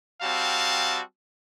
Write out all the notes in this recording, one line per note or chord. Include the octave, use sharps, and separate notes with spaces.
G3 C4 F#4 F5 A5